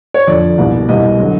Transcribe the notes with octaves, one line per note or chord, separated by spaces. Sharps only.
C#5
F2 D3 F3 D5
C2 B2 G3
C2 B2 G3 D#5
D3 F#3